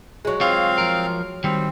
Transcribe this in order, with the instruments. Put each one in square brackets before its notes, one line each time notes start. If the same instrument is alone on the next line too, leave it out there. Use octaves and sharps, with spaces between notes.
[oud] F#3 G#3
[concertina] C4 F5 [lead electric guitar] F4 C#5
[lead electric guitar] F3 A#4
[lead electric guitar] D#3 G3 [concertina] C4